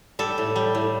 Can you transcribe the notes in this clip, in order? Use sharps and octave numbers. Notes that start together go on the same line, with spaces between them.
G3 A4
A2
G3
A2